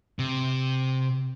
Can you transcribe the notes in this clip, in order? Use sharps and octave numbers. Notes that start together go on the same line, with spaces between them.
C3